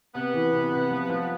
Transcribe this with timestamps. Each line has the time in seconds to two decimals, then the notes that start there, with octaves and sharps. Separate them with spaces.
0.15 C3 B3
0.34 E3
0.53 C3
0.72 C3
0.91 F3
1.10 F3